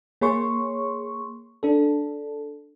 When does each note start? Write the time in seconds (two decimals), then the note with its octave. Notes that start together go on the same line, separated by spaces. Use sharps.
0.21 A#3 G#4 C#5 C6 C#6
1.63 D4 A4